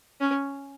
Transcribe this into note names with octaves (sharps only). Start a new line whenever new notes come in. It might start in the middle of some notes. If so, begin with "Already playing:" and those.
C#4